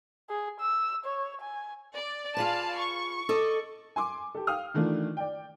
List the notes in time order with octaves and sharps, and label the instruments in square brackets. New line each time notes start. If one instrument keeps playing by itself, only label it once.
[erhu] G#4
E6
C#5
G#5
[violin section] D5
[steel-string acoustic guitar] F4 G#4 B4 [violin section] D5 F5 A5
[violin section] C#6
[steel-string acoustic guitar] A4 D5 D#5
[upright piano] G#5 C6 D6
G4 A4
F5 G5 D#6 F6
D#3 E3 A3 D4 F4
D5 G5